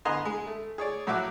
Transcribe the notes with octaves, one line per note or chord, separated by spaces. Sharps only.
D3 B3 D#5 G#5 A#5 C6
G#3
A3
G#4 C#5 D5
A2 F#3 F#4 E5 D6 F#6